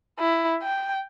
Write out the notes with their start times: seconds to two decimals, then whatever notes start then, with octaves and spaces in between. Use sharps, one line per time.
0.19 E4
0.63 G5